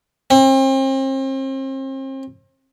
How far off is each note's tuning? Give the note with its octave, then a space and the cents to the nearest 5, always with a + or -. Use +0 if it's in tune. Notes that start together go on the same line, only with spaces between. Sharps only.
C4 +40